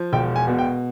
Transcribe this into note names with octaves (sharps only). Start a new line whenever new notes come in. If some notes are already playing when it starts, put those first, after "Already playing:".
Already playing: F3
E1 G5
G#5
B2
G5